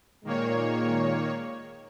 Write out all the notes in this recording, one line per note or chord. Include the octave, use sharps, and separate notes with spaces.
A#2 D#3 G#3 A#3 C#5